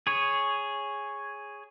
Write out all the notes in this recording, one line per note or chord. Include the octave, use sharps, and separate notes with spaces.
G#4 C#5